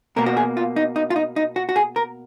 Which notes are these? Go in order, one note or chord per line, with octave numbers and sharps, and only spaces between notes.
B2 A#3 A#4
F#4
G#4
F4
D#4
D#4
F4
D#4
D#4
F#4
F#4
G#4
A#4